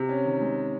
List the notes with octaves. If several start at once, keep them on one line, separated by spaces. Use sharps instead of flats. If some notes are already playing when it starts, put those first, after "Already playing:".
Already playing: C3
C#4
D#3
G#3